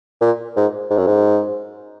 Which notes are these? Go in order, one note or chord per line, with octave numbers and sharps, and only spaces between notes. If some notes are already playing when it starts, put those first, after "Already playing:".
A#2
G#2
G#2
F#2
G#2